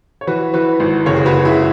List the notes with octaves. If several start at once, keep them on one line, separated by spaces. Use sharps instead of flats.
C#5
E3 F#4 B4
E3 F#4 B4
G#1
F#1 G#4 C#5
G#4
F#4 B4
F#1
E4 G#4